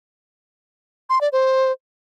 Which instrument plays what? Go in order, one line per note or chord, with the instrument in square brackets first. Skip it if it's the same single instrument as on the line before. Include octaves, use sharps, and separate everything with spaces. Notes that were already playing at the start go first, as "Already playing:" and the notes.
[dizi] C6
D5
C5